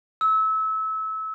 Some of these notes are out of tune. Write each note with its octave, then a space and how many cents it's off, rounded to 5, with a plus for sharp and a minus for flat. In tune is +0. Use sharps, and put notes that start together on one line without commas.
E6 -25